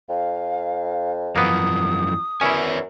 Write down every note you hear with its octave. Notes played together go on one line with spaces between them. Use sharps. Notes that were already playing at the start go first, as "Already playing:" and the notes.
F2 F5
F#2 E3 F3 A#3 B3 D#6
F#2 C#4 E4 B4 D5 G#5